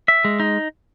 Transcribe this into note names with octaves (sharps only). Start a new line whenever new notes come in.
E5
G#3
D#4